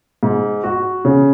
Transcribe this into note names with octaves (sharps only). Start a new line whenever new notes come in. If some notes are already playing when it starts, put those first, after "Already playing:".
G#2
F#4
C#3